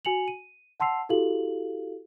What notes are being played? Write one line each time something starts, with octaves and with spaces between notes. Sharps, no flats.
F#4 G#5 C#7 F7 F#7
D#7
F#5 A5 C6 E6 C7 F7
E4 F#4 G4 A4 F5 F#7